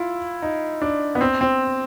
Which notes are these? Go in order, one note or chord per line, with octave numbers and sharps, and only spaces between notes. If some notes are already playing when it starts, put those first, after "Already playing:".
Already playing: E4 F4
D#4
D4
B3
C4
C4